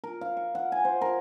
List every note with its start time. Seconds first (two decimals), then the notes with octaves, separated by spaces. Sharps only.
0.04 A#4
0.21 F5
0.37 C#6
0.55 F#5
0.72 G#5
0.85 C5
1.02 A#4